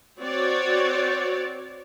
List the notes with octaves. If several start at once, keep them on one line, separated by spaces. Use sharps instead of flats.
C4 F#4 C#5 D5